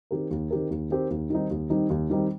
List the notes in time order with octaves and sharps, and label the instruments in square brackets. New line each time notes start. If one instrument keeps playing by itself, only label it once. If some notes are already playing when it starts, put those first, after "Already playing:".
[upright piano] D#3 C4 G4 A#4
D#2
D#3 C4 G4 A#4
D#2
D#3 C4 G4 A#4
D#2
D#3 G3 C4 D#4
D#2
D#3 G3 C4 D#4
D#2
D#3 G3 C4 D#4